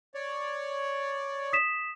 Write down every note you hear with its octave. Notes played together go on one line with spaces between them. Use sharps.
C#5 D5
D#6 B6 E7